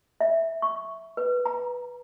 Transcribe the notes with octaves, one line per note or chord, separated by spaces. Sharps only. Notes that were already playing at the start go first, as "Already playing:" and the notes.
E5
C#6
B4
A#5